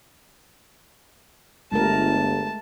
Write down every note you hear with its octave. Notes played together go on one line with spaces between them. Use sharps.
G1 G#3 A3 A#4 A5